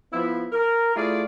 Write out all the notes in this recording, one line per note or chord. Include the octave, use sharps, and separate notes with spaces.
F3 B3 E4
A#4
A3 E4 F4 G#4 D5